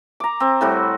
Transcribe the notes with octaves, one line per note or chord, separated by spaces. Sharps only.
A#5 D6
C4
A2 G3 F#4